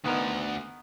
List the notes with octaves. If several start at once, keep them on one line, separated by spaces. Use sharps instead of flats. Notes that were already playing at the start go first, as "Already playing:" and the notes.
D2 D3 D#3 B3 A#4